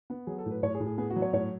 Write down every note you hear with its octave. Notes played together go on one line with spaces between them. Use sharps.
B3
F#3 G#4
A4
A2
B4
A2 C#5
G#4
A2
G#4
B3 G#4
F#4
F#3
C#5
A2 C#5